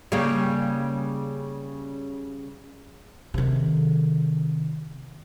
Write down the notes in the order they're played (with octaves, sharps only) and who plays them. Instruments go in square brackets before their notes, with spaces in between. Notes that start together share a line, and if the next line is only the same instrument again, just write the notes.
[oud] C#3 G3 A#3
[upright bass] C3 D#3